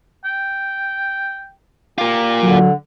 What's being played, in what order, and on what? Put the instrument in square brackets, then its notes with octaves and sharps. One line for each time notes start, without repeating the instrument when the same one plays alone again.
[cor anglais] G5
[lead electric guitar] A#3 F4 [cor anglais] G4
[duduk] D3 [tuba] F#3